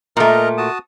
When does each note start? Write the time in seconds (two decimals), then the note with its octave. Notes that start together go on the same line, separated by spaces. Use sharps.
0.17 A#2 A3 A#4 D#5 A#5
0.57 F#4 A5 D#6